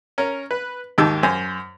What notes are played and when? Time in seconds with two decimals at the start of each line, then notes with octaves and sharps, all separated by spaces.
0.18 C#4 A#4
0.51 B4
0.98 D#2 G#2 D#3 G4 A5 E6
1.23 F#2 C5 G#5